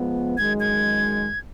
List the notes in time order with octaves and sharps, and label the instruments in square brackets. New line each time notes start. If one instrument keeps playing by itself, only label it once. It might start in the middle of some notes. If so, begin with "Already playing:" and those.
Already playing: [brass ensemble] F3 G#3 B3
[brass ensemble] F#2 D#3 G#3 [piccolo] G#6
[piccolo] G#6